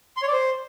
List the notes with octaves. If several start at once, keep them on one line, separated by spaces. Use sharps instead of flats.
C6
C#5
D5
C5